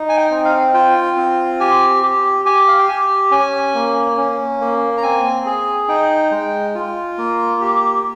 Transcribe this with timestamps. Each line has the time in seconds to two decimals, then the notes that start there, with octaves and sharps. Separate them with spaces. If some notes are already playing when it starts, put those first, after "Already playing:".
Already playing: D#4
0.09 G#5
0.17 G5
0.31 C4
0.45 F5
0.74 F4 G5
1.17 C4
1.60 G4 G#5
2.03 G4
2.45 G4 G#5
2.68 F5
2.79 G5
2.88 G4 G#5
3.31 C#4 G#5
3.74 A#3
4.18 C#4
4.61 A#3
4.97 A#5
5.03 C4 G#5
5.46 G#4
5.88 D#4 G5
6.31 G#3
6.75 F4
7.18 A#3
7.61 G4